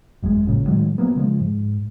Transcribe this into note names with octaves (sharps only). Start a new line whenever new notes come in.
G#1 F#2 D3 G#3
A1 A#2 C#3
A2 D#3 F#3 G#3
F3 F#3 A#3 B3
C#3 F3 G#3
G#2